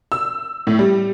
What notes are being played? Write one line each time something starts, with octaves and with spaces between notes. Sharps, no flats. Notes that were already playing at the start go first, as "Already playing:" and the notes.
E6
A2
G3